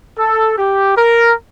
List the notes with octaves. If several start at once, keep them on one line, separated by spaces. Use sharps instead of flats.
A4
G4
A#4